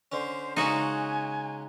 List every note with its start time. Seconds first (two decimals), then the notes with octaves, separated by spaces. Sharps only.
0.12 D3 C#4 C5
0.57 C#3 G#3 C#4 D#4 F#4 G#5